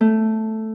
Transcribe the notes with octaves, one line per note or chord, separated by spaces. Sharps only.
A3